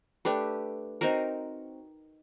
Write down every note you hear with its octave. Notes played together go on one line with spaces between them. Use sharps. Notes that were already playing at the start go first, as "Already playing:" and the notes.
A3 D4 G4 B4
C4 D#4 F#4 A#4